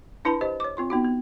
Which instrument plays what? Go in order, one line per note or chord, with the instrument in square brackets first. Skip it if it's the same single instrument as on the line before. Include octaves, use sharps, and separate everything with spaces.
[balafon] D4 E4 B4 A5 B5
G4 C5 D#5
C#5 D6
C4 F4 C#6
B3 D#4 F#4
B3